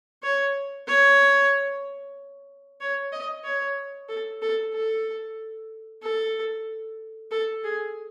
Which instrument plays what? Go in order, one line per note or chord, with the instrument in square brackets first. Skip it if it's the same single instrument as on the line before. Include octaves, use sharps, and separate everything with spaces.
[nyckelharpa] C#5
C#5
C#5
D#5
C#5
A4
A4
A4
A4
A4
G#4